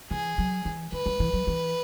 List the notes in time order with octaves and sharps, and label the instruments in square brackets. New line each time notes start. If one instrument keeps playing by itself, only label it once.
[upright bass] E3 [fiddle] G#4
[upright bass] F#3
E3
[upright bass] E3 [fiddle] B4
[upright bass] F#3
E3
F#3
E3